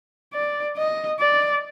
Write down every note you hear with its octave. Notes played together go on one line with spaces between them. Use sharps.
D5
D#5
D5